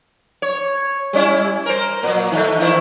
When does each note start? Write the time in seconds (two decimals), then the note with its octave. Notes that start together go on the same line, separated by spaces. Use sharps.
0.42 C#5
1.13 G3 C#4 E4
1.66 A#4 C5
2.03 A#2 F#3
2.32 D#3 A3
2.58 D#3 E3 E4